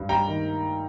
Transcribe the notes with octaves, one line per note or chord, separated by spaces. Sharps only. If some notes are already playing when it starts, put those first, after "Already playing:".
Already playing: G2
G3 G5 A#5
D#3